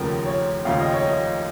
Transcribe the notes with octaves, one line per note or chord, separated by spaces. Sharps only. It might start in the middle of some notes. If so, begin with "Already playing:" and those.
Already playing: F1 D#2 C#3 F3 A#4
C#5
F1 D#2 C#3 F3 F5
D#5
C#5
D#5